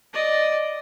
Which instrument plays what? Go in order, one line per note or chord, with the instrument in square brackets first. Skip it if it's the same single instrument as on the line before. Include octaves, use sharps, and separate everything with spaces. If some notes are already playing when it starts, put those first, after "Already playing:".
[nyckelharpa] D5 D#5